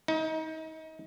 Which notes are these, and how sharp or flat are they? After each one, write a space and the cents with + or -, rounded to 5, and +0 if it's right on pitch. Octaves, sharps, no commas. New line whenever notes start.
D#4 +30